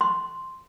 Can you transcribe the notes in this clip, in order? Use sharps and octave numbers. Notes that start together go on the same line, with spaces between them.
C6